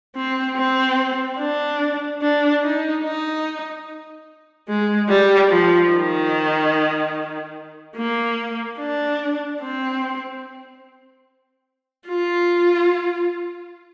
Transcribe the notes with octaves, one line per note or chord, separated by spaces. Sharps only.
C4
C4
D4
D4
D#4
D#4
G#3
G3
F3
D#3
A#3
D4
C4
F4